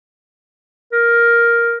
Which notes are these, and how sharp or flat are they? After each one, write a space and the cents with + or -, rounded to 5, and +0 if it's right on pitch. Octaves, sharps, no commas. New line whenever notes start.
A#4 +5